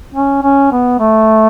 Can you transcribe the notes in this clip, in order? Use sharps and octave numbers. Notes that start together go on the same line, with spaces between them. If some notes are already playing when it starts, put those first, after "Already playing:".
C#4
C#4
B3
A3